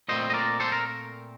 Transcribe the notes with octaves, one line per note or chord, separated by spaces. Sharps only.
A#2 A3 C4 C5 D#5
D#5
A#4 D5
A4 C5
A#4